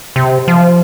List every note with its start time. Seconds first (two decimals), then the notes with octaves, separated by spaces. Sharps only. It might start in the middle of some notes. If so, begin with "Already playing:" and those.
0.16 C3
0.48 F3